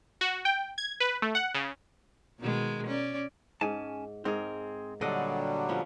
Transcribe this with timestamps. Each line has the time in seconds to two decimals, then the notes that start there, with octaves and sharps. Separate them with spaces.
0.21 F#4
0.45 G5
0.78 G#6
1.00 B4
1.22 A3
1.35 F#5
1.54 C#3
2.40 B2 D#3 G#3
2.87 C#4 D5
3.61 G#2 C#4 G#5 A5
4.25 G#2 C4 G#4 A#4
5.01 A#2 D3 F#3 G3 D4 A4 D5 D#5
5.69 F3 B3 C#4